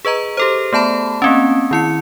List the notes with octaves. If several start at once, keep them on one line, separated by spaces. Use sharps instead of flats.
G#4 B4 D#5 A#5
G4 A4 C5
A3 B3 A5 B5
A#3 C4 C#4
D#3 E4 C#7